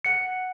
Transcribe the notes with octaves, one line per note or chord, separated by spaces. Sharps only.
F#5 C#7